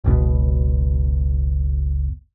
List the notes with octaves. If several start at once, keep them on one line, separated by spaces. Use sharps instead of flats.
F#1 C#2 B2